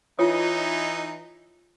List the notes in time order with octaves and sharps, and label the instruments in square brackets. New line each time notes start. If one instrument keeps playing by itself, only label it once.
[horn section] E3 D#4 [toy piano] F4 C#5 D#6